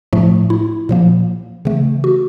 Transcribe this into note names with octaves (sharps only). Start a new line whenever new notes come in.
A2 F3 A3
E4
A#2 F3 A#3
C#3 E3 A3
F#4